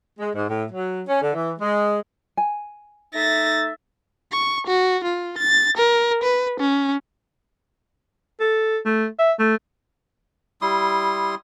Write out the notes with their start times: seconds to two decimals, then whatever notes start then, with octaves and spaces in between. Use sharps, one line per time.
0.19 G#3
0.35 G#2
0.49 A2
0.71 F#3
1.08 C#4
1.21 D3
1.33 E3
1.59 G#3
2.37 G#5
3.15 A3 D#4 E5 A6 A#6
4.32 C#6
4.67 F#4
5.04 F4
5.38 A6
5.77 A#4
6.23 B4
6.60 C#4
8.40 A4
8.85 A3
9.19 E5
9.39 A3
10.61 G3 E4 C6 D#6